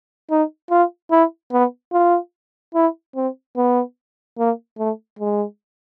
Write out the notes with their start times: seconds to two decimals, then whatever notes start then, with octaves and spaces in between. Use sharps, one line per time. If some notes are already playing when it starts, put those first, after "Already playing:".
0.31 D#4
0.71 F4
1.12 E4
1.52 B3
1.93 F4
2.75 E4
3.16 C4
3.57 B3
4.39 A#3
4.79 A3
5.19 G#3